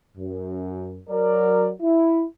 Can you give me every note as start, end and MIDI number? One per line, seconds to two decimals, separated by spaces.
0.17 0.99 42
1.09 1.70 54
1.09 1.70 70
1.09 1.70 74
1.81 2.24 64